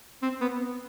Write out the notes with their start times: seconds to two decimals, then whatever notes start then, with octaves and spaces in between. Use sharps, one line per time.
0.22 C4
0.41 B3